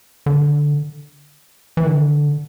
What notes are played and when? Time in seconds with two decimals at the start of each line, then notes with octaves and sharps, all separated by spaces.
0.26 D3
1.77 E3
1.86 D3